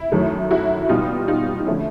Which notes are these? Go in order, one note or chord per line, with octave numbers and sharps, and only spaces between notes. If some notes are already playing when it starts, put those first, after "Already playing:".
Already playing: E4
F#2 D#3 F#3 A3
E4 F#4
B2 G3 B3 D#4 F4
D#4 F4
D#4
D3 F3 A3 C#4 E4